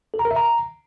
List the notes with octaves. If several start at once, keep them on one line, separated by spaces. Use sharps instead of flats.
A4
A#5
A#4
E5
A#5